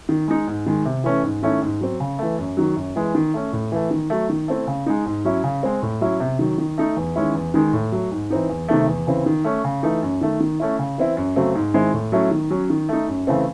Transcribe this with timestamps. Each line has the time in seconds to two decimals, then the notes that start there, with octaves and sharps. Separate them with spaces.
0.09 D#3
0.28 G#3 D#4
0.47 G#2
0.66 D#3 G#3
0.85 C3
1.04 E3 A3 C#4
1.23 G#2
1.43 D#3 A3 C#4 E4
1.62 G#2
1.81 F#3 C4
2.00 C#3
2.19 E3 A3
2.38 F#2
2.57 D#3 F#3
2.76 F#2
2.96 E3 G#3
3.15 D#3
3.34 A3 C#4
3.53 A2
3.72 E3 A3
3.91 D#3
4.10 F#3 A3
4.30 D#3
4.48 A3 C4 E4
4.67 C#3
4.86 G#3 D#4
5.06 G#2
5.25 F#3 C#4 E4
5.44 C#3
5.63 G#3 C4
5.82 A2
6.01 F#3 C#4 E4
6.20 C3
6.39 D#3 F#3
6.58 D#3
6.78 A3 D#4
6.97 E2
7.16 D#3 G#3 C#4 E4
7.35 E2
7.54 D#3 G#3 D#4
7.73 A2
7.92 F#3 A3
8.11 G#2
8.30 E3 C4 D#4
8.49 E2
8.69 C3 D#3 A3
8.88 E2
9.07 C#3 E3 C4
9.26 D#3
9.44 A3 C#4
9.64 C#3
9.83 E3 A3 D#4
10.03 F#2
10.21 D#3 A3
10.40 D#3
10.60 A3 C#4 E4
10.79 C#3
10.98 E3 C4 E4
11.17 F#2
11.36 C#3 F#3 A3 C4
11.55 G#2
11.74 D#3 G#3 C4 E4
11.94 A2
12.12 F#3 A3 C#4 E4
12.31 D#3
12.50 F#3 C#4
12.70 D#3
12.89 A3 D#4
13.08 F#2
13.27 C#3 E3 A3 C4